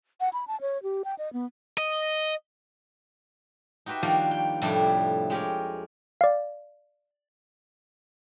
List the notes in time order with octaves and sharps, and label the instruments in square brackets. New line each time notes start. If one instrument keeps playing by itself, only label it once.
[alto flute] F#5
B5
A5
C#5
G4
G5
D#5
B3
[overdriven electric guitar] D#5
[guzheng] D#4 F#4 G4 B4 E5
D#3 F3 G3 A#3 D4 F#4
G5
F2 A2 C3 G3 D4 E4
G#3 G4 A#4 C#5
[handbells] D5 F5